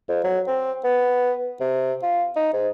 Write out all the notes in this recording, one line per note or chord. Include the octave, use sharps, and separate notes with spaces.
F2
F#3
C4
B3
C3
F4
D#4
G#2